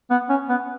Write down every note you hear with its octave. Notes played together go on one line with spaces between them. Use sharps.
B3
C#4
B3